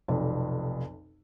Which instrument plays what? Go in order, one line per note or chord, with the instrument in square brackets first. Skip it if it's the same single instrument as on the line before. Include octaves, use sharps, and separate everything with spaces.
[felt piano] F1 B1 F2